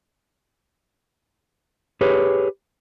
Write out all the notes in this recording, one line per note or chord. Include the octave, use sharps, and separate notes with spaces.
G4 G#4 B4 C#5